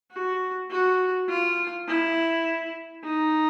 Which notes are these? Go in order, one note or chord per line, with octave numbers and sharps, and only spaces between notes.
F#4
F#4
F4
E4
D#4